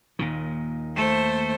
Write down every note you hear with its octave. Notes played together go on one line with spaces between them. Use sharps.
D#2 A#2 D#3
A3 A4 C5